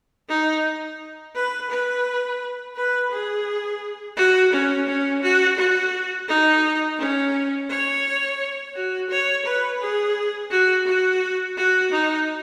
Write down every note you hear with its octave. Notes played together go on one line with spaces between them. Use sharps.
D#4
B4
B4
B4
G#4
F#4
C#4
C#4
F#4
F#4
D#4
C#4
C#5
F#4
C#5
B4
G#4
F#4
F#4
F#4
D#4